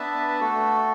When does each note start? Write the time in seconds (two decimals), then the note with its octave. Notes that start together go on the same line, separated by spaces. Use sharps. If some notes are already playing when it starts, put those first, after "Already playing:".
Already playing: B3 D4 B4 E5 A5
0.40 A3 F#4 A4